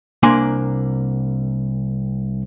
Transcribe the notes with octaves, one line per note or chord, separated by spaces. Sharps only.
C2 A#3 D4 G#5 C6